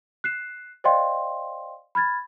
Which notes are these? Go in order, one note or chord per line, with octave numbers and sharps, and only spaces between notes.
F#6 C7 E7
C5 D5 D#5 F5 G5 C6
B5 F6 G#6 A6